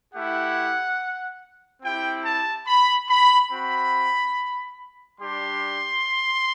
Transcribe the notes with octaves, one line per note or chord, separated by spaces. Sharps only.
A3 E4 G4 F#5
C4 E4 G4 G5
A5
B5
B5
C4 F#4 B5
G3 D4 G4 C6